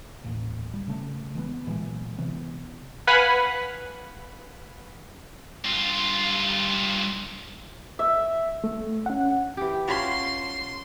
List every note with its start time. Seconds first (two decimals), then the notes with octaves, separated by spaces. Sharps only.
0.24 D#1 A1 A2 A#3
0.73 D1 G3
0.88 C#3 A3
1.35 E3 G#3 A3 B3
1.67 A#2 E3 F#3 G#3
2.18 C3 E3 B3
3.07 B4 F5 F#5 G#5 B5
5.64 G2 F4
7.99 E5
8.64 A3
9.06 C#4 F#5
9.57 E3 G4
9.88 C#4 F4 F#4 C6